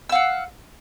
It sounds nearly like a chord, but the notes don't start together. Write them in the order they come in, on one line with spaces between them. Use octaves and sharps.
E6 F5 F#5